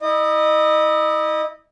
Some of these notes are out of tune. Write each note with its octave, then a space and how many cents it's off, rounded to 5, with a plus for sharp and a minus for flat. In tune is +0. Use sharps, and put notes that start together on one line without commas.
E4 -30 D#5 -30